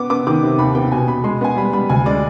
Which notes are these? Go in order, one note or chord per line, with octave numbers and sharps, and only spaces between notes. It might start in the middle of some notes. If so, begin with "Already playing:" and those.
Already playing: B3 D6
B3 D6
D#3 D6
C3
D#2 B5
B3 G5
B2 G#5
B2 B5
G#3 C6
B3 G#5
G3 B5
G3 B5
D2 G#5
G#3 D5